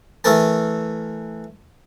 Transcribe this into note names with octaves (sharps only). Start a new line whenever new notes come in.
E3 A3 A4 A#4 A5